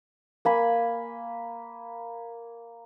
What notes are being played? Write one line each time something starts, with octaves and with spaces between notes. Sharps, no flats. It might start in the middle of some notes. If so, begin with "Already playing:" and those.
A#3 G#5 B5